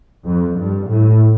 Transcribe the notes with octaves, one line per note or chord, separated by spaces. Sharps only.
F2
G2
A2